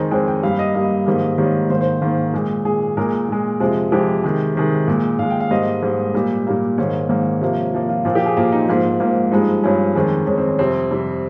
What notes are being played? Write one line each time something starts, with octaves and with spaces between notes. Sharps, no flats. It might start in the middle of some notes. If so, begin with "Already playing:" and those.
Already playing: F2 D#3 G#3 D#4 C5
F2 D#3 G#3 G5
G5
G2 G3 A#3 F5
D#5
G2 G3 A#3 D#5
G#2 D#3 G3 A#3
G#2 D#3 G3 A#3 C#5
G#2 D#3 A#3 C5
C5
G#2 D#3 A#3
A#2 G#3
A#2 G#3 G#4
A#2 G#3 A#4
A#2 G#3
F2 C3 F3 G#3
F2 C3 F3 G#3 G4
C3 D#3 G#3
C3 D#3 G#3
A#2 G#3
A#2 G#3 F5
G5
F5
G#2 G3 A#3 D#5
G#2 G3 A#3
A#2 G3 A#3
A#2 G3 A#3
G#2 D#3 A#3 C#5
G#2 D#3 A#3
C3 F3 A#3
C3 F3 A#3
F4
A#2 F3 A#3 F4
G4
G#4
A#2 F3 A#3 F4
D#4
G#2 F3 A#3 F4
G#2 F3 A#3
G2 F3 G#3 D#4
G2 F3 G#3 C#4
F2 D#3 G#3
F2 D#3 G#3 C#4
C4
C#4
F2 C3 G3 C4
F2 C3 G3